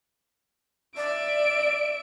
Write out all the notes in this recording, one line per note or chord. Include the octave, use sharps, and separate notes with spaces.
D5 E5 D7